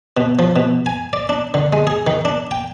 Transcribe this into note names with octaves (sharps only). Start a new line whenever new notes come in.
B2
F3
B2
G#5
D5
D4
D3
G#3
G#4
D#3
D4
G5